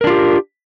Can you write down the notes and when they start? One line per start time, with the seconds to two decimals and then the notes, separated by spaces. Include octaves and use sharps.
0.01 A#4
0.04 D4
0.07 F4
0.10 G4